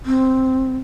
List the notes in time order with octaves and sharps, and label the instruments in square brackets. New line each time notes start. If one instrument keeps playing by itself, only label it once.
[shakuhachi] C4